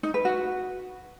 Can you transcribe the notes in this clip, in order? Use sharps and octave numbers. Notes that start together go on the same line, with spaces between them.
D#4
B4
F#4